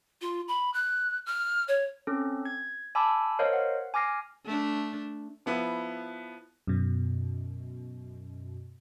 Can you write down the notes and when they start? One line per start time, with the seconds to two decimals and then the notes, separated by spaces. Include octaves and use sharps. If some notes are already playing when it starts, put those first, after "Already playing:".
0.22 F4
0.48 B5
0.74 F#6
1.26 F6
1.68 C#5
2.07 C4 C#4 A4
2.45 G#6
2.95 G#5 A5 B5 D6 E6
3.39 A#4 C5 C#5 D#5 F5
3.53 F#5
3.94 G#5 D6 F6 A#6 C7
4.45 A3 D4
5.46 F3 B3 E4
6.67 F#2 B2